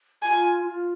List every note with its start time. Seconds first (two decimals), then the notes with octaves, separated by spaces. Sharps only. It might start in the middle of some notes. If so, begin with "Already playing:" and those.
0.23 F4 G#5
0.67 F4